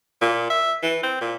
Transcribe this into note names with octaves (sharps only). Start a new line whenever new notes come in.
A#2
E5
E3
C4
A#2